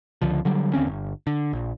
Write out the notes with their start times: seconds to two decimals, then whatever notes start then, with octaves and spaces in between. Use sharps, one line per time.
0.22 C#2 D3 F3
0.45 D3 F#3 G3
0.73 D#2 D3 C4 C#4
0.87 G1
1.27 D3
1.53 A#1